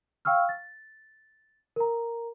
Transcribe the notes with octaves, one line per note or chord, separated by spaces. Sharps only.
F5 G5 C#6 E6 F6
A6
A#4 A#5